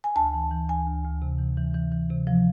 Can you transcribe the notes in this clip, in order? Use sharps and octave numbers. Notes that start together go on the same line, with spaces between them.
G#5
D2 A5
E3
E3
D2 G#5
D2
D2
C3
E3
E3
E3
E3
C3
F3